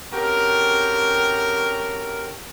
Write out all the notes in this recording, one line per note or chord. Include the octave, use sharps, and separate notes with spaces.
C4 C#4 F#4 G4 A4 A#4